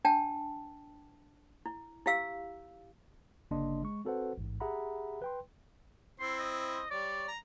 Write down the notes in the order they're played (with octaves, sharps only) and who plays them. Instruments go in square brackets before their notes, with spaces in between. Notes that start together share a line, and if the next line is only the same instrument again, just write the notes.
[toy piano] D4 G5 A5
E4
E4 G4 F5 E6
[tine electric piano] G1 C#3 A#3 D4 D#5 C6
G#3 C#6
C4 F#4 A4 B4 C5 F#5
A1 G#2
G4 G#4 E5 F#5 A#5 B5
B4 G5 C6
[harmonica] C4 E4 C5 [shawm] C6
[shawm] D#5
[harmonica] G3 C#5 [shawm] D5
[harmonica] A#5